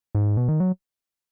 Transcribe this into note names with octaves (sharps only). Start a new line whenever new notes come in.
G#2
B2
D#3
F#3